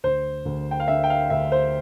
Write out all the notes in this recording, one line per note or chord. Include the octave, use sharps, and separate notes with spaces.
D2 C5
D2
G5
F5
D3 E5
G5
F5
D2 E5
C5